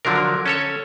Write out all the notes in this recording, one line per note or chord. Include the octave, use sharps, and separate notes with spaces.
D3 F3 F#3 D4 A#4
C#4 A4 C#5